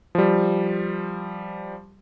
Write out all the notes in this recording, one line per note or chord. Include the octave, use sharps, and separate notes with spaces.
F3 G3